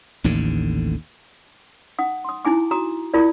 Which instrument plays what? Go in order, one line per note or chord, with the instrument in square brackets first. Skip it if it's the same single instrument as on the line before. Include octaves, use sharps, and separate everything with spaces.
[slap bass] A1 D#2 A2 D3
[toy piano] D#4 F#5 D#6
C6 D#6
D#4 E4 G#5 D6
F#4 A#5 D#6
E4 F4 A#4 D5